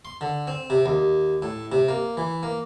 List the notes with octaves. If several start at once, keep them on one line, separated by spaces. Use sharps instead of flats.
C6
D3
C4
C3
D#2
A2
C3
A#3
E3
A#3